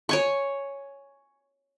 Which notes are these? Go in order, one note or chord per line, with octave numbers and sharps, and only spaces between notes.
C#5 G#5 C#6